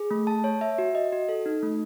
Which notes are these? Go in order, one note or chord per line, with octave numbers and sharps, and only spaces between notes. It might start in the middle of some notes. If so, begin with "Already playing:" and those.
Already playing: G#4
A3
A5
C#5
E5
F#4
D#5
F#4
A4
D#4
A3